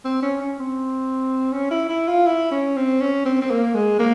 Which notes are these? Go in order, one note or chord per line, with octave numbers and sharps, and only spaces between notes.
C4
C#4
C#4
C4
C#4
E4
E4
F4
E4
C#4
C4
C#4
C4
C4
A#3
G#3
A#3